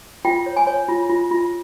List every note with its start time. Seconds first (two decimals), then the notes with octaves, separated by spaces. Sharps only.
0.25 F4 G5
0.46 C#5
0.56 G#5
0.67 C#5
0.88 F4
1.09 F4
1.31 F4